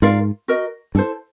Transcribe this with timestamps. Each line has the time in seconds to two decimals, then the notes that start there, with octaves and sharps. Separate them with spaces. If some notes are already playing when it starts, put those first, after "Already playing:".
0.02 G#2 F4 A#4 D5 F5
0.48 F#4 A#4 D#5
0.95 G2 E4 A4 C5